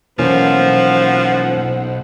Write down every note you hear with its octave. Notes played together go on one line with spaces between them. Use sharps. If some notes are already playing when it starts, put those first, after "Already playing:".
B1 E3 F3 A#3 C#4 C5 F#5